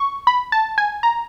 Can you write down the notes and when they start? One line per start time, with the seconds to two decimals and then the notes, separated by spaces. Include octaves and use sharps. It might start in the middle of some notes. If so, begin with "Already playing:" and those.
Already playing: C#6
0.27 B5
0.52 A5
0.78 G#5
1.03 A#5